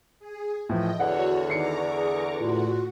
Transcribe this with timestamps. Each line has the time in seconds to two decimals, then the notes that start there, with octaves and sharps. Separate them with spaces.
0.20 G#4
0.69 A2 E3 F3 D#5 G5
1.00 E2 D3 F#4 C#5 F#5
1.50 D#3 A#5 C#6 D6 C7 C#7
1.94 G#4
2.39 A2 F4 F#4